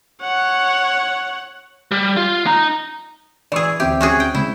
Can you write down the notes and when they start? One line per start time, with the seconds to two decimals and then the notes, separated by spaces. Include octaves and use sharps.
0.22 C#5 F#5
1.91 G3
2.17 F4
2.46 D#4 A#5
3.52 E3 G#4 D5 C#6 E6
3.80 D2 C4 G4 E5
4.01 C#4 F#4 G#4
4.20 G5
4.35 C#3 G#3 C4 E4